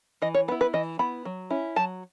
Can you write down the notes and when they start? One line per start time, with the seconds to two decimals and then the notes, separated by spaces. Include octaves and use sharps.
0.22 E3 D#5
0.34 C#5
0.48 B3 B4
0.52 E4
0.61 B4
0.74 E3 D#5
0.99 B3 E4 B5
1.25 F#3
1.50 C#4 E4
1.76 F#3 A5